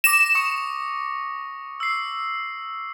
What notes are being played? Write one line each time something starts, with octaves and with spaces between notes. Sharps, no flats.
D6 A#6 E7
C#6 D#6 C#7
E6 C7